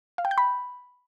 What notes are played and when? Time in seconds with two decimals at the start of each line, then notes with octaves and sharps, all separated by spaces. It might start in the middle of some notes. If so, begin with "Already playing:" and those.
0.18 F5
0.25 G5
0.31 G6
0.38 B5